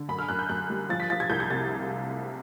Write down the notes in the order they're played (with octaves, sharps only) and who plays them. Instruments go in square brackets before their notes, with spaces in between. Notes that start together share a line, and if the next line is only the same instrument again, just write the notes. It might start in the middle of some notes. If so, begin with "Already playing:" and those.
Already playing: [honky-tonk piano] D3
F#2 B5
F6
F#2 F#6
G6
F#2 F#6
G3
F3 A6
B6
F3 A6
G#6
C2 G6
G#6
C3 A6